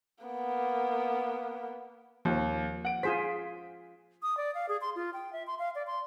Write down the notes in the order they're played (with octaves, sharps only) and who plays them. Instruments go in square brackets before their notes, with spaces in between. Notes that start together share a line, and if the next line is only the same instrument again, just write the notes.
[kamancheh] A#3 B3
[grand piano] D#2 [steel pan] F3
[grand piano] F#5 D7
[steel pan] F4 G#4 C5 [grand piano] B6
[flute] D#6
D5
F5
G#4
C6
F4
G5
E5
C6
F5
D5
C6